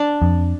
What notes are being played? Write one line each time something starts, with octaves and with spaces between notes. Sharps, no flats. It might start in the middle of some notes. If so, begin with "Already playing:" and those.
Already playing: D4 D5
F2